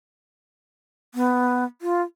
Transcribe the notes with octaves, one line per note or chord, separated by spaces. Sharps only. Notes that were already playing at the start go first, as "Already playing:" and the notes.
B3
F4